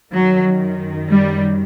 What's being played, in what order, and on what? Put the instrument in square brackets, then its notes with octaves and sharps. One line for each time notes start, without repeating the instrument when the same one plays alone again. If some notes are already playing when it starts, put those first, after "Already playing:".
[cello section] F#2 D#3 F#3
G3